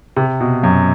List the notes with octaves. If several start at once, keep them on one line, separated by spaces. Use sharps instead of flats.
C3
B2
F#2